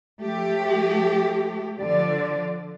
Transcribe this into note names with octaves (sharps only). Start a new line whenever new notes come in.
F3 A3 G4
D3 F3 D5